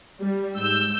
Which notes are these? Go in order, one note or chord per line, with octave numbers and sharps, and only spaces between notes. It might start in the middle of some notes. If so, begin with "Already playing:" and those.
G3
G#2 E6 G6